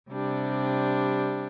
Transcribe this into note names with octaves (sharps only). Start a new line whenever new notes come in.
C3 G3 D4